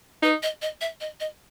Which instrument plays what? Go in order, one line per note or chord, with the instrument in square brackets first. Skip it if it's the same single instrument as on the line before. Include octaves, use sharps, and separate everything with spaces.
[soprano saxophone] D#4 [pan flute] B4
[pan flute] D#5
D#5
E5
D#5
D#5